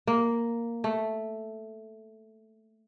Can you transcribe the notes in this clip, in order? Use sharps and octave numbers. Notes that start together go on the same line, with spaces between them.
A#3
A3